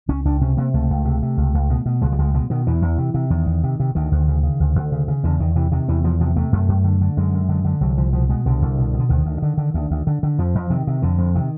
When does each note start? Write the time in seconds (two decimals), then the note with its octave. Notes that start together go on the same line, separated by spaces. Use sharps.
0.09 C#2 C#4
0.25 C#2 D4
0.41 C3 C#4
0.57 C3 A#3
0.74 C#2 A3
0.90 C#2
1.05 C3
1.22 C3
1.37 C#2
1.54 C#2
1.70 B2
1.86 B2
2.02 C#2 G#3
2.12 G3
2.19 C#2 G#3
2.34 B2 G#3
2.50 B2 D#3
2.67 E2 E3
2.82 E2
2.98 C3
3.14 C3
3.30 E2 D#3
3.46 E2
3.63 C3
3.80 C3
3.95 D2 D#3
4.12 D2
4.28 C#3
4.43 C#3
4.60 D2
4.75 D2
4.92 C#3
5.08 C#3
5.23 E2 D3
5.40 E2 D#3
5.56 C3 E3
5.72 C3 D#3
5.88 E2 E3
6.04 E2 F3
6.20 C3 F3
6.36 C3 A3
6.52 F#2 A3
6.68 F#2
6.84 D3
7.01 D3
7.17 F#2 G#3
7.34 F#2
7.49 D3
7.65 D3
7.81 C2 F#3
7.97 C2 F3
8.13 B2 F3
8.29 B2 G#3
8.45 C2 D3
8.62 C2
8.78 B2
8.94 B2
8.99 D3
9.09 D2 D#3
9.25 D2
9.42 D3
9.58 D3
9.74 D2
9.91 D2
10.07 D3
10.23 D3
10.38 F2 F3
10.55 F2
10.70 C3 D#3
10.87 C3
11.02 F2 D3
11.18 F2
11.35 C3 D#3